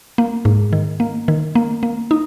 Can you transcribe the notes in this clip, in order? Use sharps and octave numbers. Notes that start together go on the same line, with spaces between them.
A#3
G#2
D#3
A#3
D#3
A#3
A#3
D#4